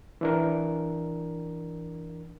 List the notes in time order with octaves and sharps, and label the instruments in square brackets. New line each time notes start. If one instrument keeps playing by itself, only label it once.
[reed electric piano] E3 D4 A#4